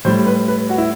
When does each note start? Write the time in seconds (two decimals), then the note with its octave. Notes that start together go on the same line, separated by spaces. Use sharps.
0.05 A2 G3 C5
0.26 B4
0.48 B4
0.69 F#4
0.78 E4